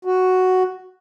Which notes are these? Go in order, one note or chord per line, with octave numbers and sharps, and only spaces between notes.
F#4